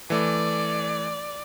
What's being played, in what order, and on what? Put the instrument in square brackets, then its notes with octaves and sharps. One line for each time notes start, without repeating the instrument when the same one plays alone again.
[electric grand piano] E3 A3 [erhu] D5